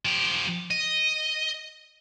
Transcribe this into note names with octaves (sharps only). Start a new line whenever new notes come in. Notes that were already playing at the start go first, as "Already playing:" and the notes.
F3 G4
D#5